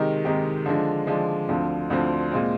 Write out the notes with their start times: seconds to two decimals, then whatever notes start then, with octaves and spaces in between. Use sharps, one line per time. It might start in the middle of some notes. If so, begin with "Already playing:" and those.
Already playing: C3 D#3 G#3 D#4 G4
0.25 C3 D#3 G#3 D#4 G4
0.66 D3 F3 G#3 D4
1.07 D3 F3 G#3 D4
1.49 D2 D3 F3 C4
1.90 D2 D3 F3 C4
2.32 A#2 G#3 C4